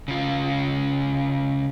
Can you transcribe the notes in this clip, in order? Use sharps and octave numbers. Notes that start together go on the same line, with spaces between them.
C#3 F4